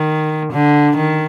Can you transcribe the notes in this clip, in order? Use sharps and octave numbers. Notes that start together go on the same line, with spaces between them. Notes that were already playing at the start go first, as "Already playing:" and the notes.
Already playing: D#3
D3
D#3